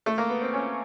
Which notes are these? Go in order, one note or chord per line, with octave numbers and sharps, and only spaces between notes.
A3
A#3
B3
C4
C#4